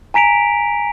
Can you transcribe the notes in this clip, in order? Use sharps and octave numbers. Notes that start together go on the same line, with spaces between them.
G#5 A#5 B6 D7 F7